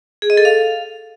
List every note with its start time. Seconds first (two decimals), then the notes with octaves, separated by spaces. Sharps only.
0.22 G#4
0.30 D#5
0.37 A4
0.45 F5